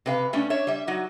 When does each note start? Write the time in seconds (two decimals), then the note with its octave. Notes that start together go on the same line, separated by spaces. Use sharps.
0.06 C3 B4 F5
0.33 G3 A3 C#4 D4
0.50 D4 C#5 E5
0.67 G3 E5
0.87 F#3 D#4 F#4